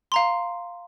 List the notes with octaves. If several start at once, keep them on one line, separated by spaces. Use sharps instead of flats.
F5 A#5 C6